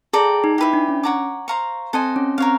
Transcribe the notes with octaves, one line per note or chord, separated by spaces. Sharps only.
G#4 A4 D5 G5 A#5
D#4
E4 G4 B4 E5
D4
C#4
C#5 F#5 A#5 D6
C5 F5 A#5 C#6
C4 A4 C5 D#5 G#5
C#4
C4 A#4 C#5 F5